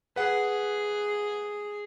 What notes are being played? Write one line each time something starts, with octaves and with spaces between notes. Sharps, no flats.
G#4 B4 F#5